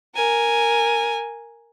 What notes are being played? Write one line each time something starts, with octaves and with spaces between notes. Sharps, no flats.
A#4 G#5